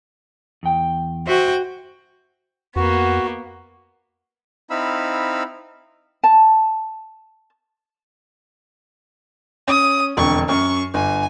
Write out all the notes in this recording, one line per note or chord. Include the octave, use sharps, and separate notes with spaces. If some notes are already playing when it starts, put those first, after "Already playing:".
E2 G5
F#4 C5 E5 G5
F2 A#3 B3 F#4
C4 D#4 E4 F5 B5 E6
A5
C#4 D#6
E1 F2 D3 C#6
F#2 C#6
G1 G#5